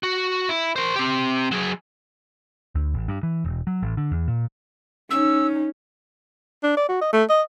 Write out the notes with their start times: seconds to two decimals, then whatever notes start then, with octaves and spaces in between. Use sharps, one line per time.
0.03 F#4
0.49 E4
0.76 A#4 C5
0.96 C4 G4
1.51 F#3 G#4
2.75 D2
2.94 A1
3.08 G2
3.23 E3
3.44 E1
3.67 F#3
3.82 A1
3.97 D3
4.11 E2
4.28 A#2
5.11 C#4 D#4 E6
6.63 D4
6.77 D5
6.89 F#4
7.01 D#5
7.13 A3
7.30 D#5